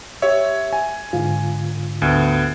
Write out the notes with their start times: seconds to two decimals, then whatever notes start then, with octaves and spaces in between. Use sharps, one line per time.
0.22 G4 C#5 E5
0.73 G#5
1.13 G#2 D3 F4
2.02 D2 B3